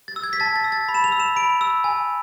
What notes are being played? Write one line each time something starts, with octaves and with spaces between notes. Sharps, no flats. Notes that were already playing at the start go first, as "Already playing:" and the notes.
A6
E6
G#6
B6
A5 A6
A6
E6
A6
B5
E7
F7
E6
E7
B5 D7
E6
G#5